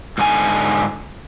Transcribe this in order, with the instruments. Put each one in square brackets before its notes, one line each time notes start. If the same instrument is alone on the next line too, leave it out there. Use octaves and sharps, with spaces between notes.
[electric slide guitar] G#2 D3 A4 G#5